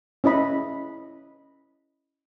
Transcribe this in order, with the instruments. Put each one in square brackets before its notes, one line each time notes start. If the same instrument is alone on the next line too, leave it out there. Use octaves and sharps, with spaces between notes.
[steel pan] C#4 E4 D#5 B5